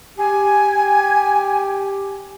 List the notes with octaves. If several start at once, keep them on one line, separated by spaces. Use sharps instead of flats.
G4 G#5